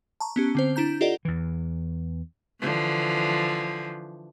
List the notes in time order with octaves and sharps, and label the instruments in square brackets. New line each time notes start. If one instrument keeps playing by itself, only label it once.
[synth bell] A5 A#5 C#6
B3 C#4 G4
D3 C4 C5
D4 E4 A#5 G6
F4 G4 A4 D5 D#5 F#5
[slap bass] E2 E3
[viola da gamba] D3 E3 F3